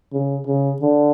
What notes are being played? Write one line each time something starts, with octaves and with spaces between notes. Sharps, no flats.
C#3
C#3
D3